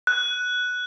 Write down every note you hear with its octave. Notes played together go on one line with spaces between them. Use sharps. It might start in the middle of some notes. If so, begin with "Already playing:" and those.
F#6